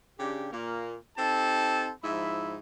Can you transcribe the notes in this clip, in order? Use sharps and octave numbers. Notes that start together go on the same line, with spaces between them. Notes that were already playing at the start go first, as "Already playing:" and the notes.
C#3 D4 G4
A#2 A#3
C4 D#4 G4 A4 A5
G#2 F3 E4 E5 B5